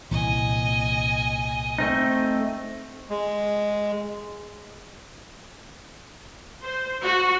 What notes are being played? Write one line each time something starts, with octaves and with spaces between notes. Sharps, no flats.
C2 A#2 E3 D#5 G#5
A3 C4 D#4
G#3
C5
F#4